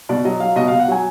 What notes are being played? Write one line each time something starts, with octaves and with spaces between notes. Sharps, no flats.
B2 D5
F#3 D#5
F#3 F5
B2 D#5
B2 F5
F#5
F#3 G#5